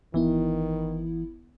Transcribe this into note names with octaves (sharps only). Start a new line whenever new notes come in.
G1 D#3 E3 B3 E4